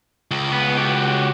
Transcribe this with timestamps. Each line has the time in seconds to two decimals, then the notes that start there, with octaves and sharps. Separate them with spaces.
0.31 C#2
0.53 B3
0.78 F#4 G4